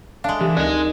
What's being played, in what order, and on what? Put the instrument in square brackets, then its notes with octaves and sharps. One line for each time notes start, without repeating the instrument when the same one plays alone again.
[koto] G#3 D4 [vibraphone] A4 E5 G#5 [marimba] F5
[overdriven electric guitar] E3 [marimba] G4
[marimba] D2 F#6 [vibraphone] D#4 A#4 [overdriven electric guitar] G#4 D#5